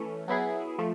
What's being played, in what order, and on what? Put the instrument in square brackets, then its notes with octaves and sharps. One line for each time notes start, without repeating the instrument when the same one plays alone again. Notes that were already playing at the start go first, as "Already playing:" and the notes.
Already playing: [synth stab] E3 A3 C#4
F#3 B3 E4 G#4
F3 A3